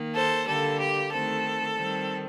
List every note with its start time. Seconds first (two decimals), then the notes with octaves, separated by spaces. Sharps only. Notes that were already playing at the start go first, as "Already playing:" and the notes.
Already playing: D#3 A#3
0.15 A4 C5
0.47 D3 G3 A#3 A4
0.80 G4
1.11 D#3 A3 C4 A4
1.76 D#3 G3 C4